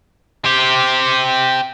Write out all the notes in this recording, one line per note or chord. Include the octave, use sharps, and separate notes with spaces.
C4 G4